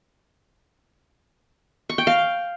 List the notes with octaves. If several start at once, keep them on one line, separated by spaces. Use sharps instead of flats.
C#6
G5
F5